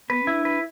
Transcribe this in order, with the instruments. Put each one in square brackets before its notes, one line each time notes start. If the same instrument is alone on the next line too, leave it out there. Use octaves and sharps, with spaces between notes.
[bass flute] B3 [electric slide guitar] B4
[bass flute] C#4 [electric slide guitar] E4
[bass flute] D4
[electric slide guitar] B4